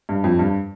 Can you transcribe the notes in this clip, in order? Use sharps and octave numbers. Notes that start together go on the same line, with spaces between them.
G2
F2
G2